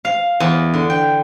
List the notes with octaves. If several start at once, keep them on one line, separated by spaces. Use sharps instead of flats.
F5
E2
D3
G5